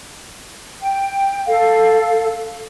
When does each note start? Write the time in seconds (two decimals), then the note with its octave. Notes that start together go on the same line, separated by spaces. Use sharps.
0.80 G5
1.46 A4 F5